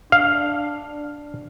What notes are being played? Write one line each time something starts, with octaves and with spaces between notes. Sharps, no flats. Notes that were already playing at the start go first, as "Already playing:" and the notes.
D4 F5